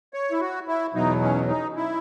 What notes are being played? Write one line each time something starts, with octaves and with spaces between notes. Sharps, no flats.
C#5
E4
F#4
E4
E2 B2 F#3 D#4
C#4
D#4
E4